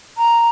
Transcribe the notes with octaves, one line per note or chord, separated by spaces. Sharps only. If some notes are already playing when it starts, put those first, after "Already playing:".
A#5